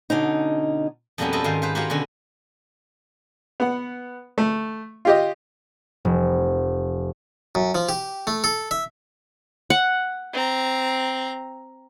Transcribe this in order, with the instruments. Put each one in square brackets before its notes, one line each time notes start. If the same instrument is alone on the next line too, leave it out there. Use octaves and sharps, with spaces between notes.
[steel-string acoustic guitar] B2 D3 C#4 D#4
[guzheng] F2 B2 G3 A#3 B3 C#4
F4 F#4 A4 B4 C5 D#5
G#2 D#3 F5
B4 C5 F5
F#4 G4 A#4 B4 C#5 F5
B2 D3 C#4 F#4
[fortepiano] B3 F#5
A3
F4 G4 D#5
[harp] F1
[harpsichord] F#2
F3
G4
A3
A4
E5
[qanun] F#5
[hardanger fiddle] C4 A#5